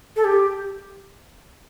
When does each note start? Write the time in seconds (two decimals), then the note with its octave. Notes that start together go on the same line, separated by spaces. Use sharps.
0.16 A4
0.24 G4